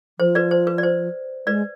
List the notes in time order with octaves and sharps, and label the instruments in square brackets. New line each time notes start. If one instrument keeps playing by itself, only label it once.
[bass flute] F3 [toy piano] C5
[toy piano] B4 D5
C5
B4
D5
C5
[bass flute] G#3 [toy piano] B4 D5